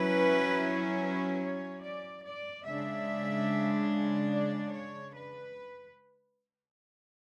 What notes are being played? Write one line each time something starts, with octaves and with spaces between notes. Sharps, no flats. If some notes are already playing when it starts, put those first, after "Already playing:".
Already playing: F#3 C#4 E4 B4
B4
C#5
D5
D5
C#3 G#3 D4 E5
D5
C#5
B4